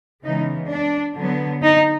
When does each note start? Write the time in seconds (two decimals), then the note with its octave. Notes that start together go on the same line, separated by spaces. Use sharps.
0.24 C#3 E3 G#3 B3 D#4
0.70 D4
1.16 D3 F#3 B3
1.63 D#4